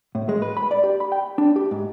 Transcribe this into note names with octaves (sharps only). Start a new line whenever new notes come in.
A2
G#3
B4
B5
D5
G4
B5
G5
D4
G4
G#2